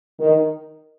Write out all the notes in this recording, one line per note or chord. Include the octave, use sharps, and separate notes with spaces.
D#3